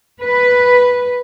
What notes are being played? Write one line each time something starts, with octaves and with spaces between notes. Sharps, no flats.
B4